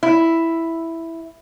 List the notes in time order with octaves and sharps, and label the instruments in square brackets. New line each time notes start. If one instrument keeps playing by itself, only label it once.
[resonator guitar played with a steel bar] E4